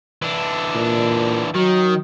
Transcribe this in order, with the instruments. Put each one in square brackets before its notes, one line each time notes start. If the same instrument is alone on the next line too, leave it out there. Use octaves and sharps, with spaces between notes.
[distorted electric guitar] E3 D4
[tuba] A#2
[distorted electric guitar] D#3 [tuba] F#3